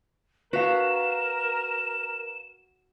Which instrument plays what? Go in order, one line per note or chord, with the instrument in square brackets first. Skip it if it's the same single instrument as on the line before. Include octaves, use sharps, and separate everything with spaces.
[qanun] F#4 [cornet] A#4 [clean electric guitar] B4 F5 [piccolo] E7